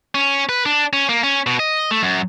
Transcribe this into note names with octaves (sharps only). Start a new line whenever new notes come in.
C#4
B4
D4
C#4
A#3
C#4
B2
D#5
A3
F#2